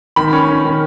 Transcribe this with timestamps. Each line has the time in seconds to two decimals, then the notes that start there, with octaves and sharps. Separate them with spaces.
0.16 D#3 B5
0.33 C#4
0.48 C#4
0.65 D#3